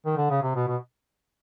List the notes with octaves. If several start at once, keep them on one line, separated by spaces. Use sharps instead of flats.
D#3
D3
C#3
C3
B2
B2